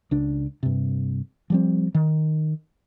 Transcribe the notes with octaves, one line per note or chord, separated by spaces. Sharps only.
C#2 D4
G2 C3
F3 G3 C4
D#3